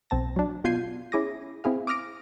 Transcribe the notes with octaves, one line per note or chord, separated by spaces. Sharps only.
B1 C4 A5 A#6
F#3 D4
B2 F4 G6 G#6 C7 D#7
C#4 E4 G#4 D6 D#6 A#6
C4 E4 G#4 F5
D6 D#6 F6 A#6 D7